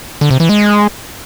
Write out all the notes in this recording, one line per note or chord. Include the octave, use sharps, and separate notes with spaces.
D3
C3
E3
G#3